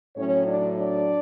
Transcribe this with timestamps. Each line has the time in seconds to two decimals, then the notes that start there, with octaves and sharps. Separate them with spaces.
0.16 A2 F#3 C#4 C#5
0.47 D4 D5
0.76 D4 D5